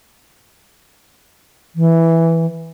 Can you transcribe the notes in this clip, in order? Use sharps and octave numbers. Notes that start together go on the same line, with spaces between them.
E3